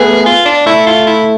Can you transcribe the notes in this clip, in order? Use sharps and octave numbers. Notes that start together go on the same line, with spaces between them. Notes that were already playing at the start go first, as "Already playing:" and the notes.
Already playing: A3 B3 G#4 A4 B4
F4
D4
A3 E4 A4
F4
E4